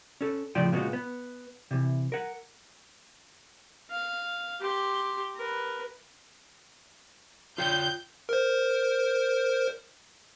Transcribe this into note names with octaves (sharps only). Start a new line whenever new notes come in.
C#4 A4
A2 C#3 F3 F4 D5 G5
A#2 C#3 G#3 B3 F4 F#4
B3
C3 E3
A#4 F#5
F5
G4 C6
A#4 B4
F4 C#5 G5 G6
A#4 C5